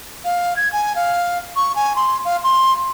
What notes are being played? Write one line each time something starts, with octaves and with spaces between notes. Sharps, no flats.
F5
G#6
G#5
F5
C#6
G#5
C6
F5
C6